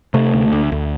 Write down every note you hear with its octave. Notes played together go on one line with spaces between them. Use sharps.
C3 A3
D2
D2
D2